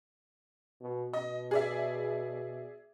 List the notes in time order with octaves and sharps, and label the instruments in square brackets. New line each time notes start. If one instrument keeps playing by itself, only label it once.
[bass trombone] B2
[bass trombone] B2 [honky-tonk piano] D#5
[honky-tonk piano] G#4 D5 E5